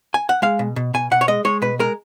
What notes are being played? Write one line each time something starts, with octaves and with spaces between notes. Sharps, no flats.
G#5
F#5
G#3 F5
B2
B2
B2 G#5
B2 F#5
C#5
G#3 D#5
G#3 C#5
B2 B4
G#3 A#4